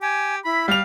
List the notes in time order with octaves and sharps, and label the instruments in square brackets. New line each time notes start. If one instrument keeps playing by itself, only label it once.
[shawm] G4 [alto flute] G#5
[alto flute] E4 [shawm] B5
[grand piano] G3 F7 [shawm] F5